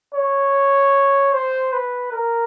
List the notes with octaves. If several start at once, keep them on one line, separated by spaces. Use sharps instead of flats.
C#5
C5
B4
A#4